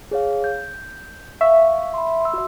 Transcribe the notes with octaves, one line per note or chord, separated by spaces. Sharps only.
G#4 C#5 F5
G6
E5 F5 C#6
B5 C6
C6 E6
F#4 E5